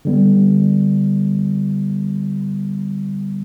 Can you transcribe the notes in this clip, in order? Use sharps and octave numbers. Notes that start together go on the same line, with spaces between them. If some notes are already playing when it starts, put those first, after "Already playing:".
D3 G3 B3